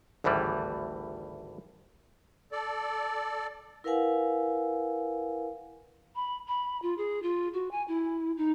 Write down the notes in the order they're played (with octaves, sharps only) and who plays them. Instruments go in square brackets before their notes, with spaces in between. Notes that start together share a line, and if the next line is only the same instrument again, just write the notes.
[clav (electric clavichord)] G#1 D2 A2 E3 G3
[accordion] A4 D5
[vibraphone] E4 A#4 B4 F5 F#5 G#5
[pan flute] B5
B5
F4
G#4
F4
F#4
G#5
E4
D#4